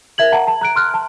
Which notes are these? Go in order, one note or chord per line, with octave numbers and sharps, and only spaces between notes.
A#4 E5 G#6 F#7
F#5 A5 A#5
A5
A#5 F#6 D7
C6 F6 F#6
A5